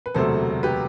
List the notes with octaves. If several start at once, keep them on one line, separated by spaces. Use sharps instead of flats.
B4
E1 D2 C3 F#3 A3 A4 C5
G4 B4